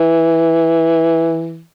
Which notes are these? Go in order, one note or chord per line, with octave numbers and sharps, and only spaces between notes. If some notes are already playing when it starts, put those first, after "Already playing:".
Already playing: E3